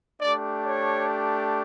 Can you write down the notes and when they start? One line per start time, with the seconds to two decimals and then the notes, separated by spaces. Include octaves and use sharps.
0.21 A3 D4 G4 D5
0.66 C#5